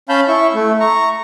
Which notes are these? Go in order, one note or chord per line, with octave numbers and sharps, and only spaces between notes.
C#4 F5 A5 B5 G6
E4 C#6
A3
A#5 C#6